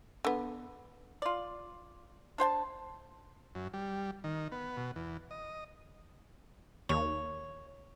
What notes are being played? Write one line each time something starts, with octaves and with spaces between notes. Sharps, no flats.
D3 B3
F4 D5
D4 C5 G5 A5
F#2
G3
D#3
B3
B2
E2
D#5
D#2 C#5